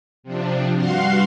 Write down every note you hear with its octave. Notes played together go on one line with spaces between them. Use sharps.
C3 F3 D4
G2 F#4 F5 F#5 C6 C7